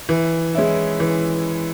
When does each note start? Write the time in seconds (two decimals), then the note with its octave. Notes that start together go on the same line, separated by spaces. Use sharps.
0.09 E3
0.55 G#3 C#4 E4
1.00 E3